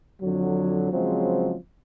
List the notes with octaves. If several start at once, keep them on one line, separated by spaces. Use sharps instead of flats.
F2 D3 F#3
C#3 F3 F#3 G#3 C4